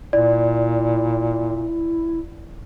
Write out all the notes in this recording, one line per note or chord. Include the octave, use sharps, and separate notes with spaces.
A#2 E4 D5